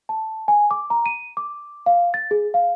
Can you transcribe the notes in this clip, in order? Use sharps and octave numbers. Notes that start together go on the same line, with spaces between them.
A5
G#5
D6
A#5
D#7
D6
F5
A6
G#4
F5